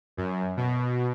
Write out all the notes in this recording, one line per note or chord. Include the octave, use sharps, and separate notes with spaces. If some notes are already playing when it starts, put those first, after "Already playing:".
F#2
B2